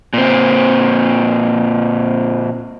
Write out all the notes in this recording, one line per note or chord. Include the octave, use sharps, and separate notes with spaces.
A#2 C4